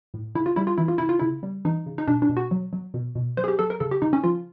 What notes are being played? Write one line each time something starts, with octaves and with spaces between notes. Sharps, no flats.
A2
C#3 E4
F4
G3 E4
F4
E3 E4
F4
C#3 E4
F4
C#3 E4
G3
E3 D#4
C#3
D#4
B2 D4
D4
B2
F#4
F#3
F#3
B2
B2
F#3 C5
G#4
G4
F#3 A4
A#4
C#3 A4
G4
C#3 D#4
C#4
F3 F4